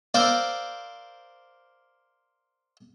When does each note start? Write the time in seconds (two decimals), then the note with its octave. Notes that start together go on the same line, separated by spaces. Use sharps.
0.14 A#4 C5 D5 F5 E6